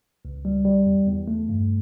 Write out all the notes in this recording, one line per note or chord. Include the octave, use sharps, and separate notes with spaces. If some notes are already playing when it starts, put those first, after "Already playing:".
C#2
G3
G3
E2
E2
A3
G2